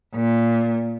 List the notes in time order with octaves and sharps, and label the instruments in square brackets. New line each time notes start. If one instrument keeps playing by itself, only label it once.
[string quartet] A#2